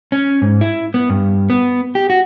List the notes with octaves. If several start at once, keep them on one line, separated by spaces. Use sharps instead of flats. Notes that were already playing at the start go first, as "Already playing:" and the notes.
C#4
G#2
E4
B3
G2
B3
G4
F#4